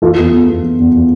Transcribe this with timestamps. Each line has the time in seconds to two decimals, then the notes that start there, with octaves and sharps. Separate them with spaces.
0.02 E3 F4 A4
0.18 E2
0.32 E2
0.48 E2
0.64 E2
0.79 E2
0.94 E3